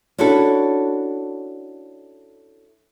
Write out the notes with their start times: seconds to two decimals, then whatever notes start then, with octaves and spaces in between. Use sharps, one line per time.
0.18 C#4 D4 E4 F#4 A4